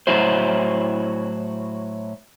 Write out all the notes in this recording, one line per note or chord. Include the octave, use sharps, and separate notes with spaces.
A2 F#3 E4 F#4 C5